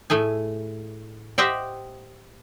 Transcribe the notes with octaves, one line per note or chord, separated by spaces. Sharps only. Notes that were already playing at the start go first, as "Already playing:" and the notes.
A2 A3 G#4 G#5
G4 C5 D#5 E5 F#5 G5